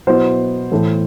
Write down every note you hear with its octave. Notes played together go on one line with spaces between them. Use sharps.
B2 F#3 B3 E4 C5
A2 E3 A3